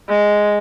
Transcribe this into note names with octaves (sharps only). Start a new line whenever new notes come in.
G#3